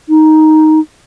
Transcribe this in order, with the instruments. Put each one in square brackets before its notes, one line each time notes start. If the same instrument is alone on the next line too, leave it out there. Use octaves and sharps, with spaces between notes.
[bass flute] D#4